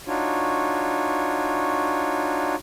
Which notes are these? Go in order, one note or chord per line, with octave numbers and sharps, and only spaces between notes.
D4 D#4 F4 F#4 C#5